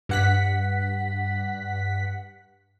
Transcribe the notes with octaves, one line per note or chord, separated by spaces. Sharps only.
G2 F#5 B6